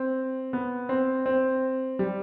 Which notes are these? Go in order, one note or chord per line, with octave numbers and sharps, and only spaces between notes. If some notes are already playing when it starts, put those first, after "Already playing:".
Already playing: C4
B3
C4
C4
G3